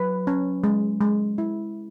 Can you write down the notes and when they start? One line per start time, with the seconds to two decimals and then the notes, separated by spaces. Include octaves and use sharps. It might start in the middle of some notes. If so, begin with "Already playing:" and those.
Already playing: F#3 B4
0.27 C#4
0.64 G#3
1.01 G#3
1.38 E4